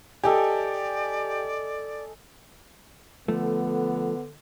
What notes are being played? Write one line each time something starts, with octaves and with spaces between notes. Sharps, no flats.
G4 A4 D5 D#5 G#5
D3 F3 A3 B3